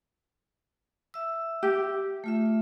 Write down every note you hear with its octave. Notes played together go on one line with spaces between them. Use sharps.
E5 E6
G4
A3 F4 E5